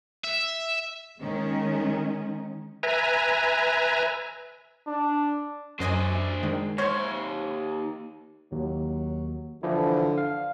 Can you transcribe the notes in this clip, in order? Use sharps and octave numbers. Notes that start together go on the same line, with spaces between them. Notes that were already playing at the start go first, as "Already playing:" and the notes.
E5
D#3 G#3 C#4
B4 E5 G#5 A#5
D4
F#2 D4 C5 D#5 G#5
D#3 G#3
D#2 C5 C#5 C6 C#6
D#2 F#3
D3 E3 F3 E4
F5